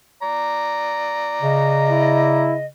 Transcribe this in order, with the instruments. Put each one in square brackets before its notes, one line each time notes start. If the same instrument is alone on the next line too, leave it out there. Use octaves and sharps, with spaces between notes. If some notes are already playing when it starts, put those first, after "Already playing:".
[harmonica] D5 A#5
[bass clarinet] C#3 [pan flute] D#5
[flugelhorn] E4